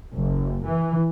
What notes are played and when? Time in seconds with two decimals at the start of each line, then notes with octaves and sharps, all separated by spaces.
0.15 F#1
0.65 E3